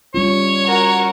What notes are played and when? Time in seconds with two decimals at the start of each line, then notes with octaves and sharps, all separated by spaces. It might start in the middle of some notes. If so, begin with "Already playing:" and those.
0.15 G3 C#4 F4 C#5
0.65 F#4 A#4